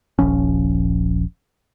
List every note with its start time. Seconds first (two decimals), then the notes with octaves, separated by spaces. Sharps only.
0.19 D#1 A#1 F3 C#4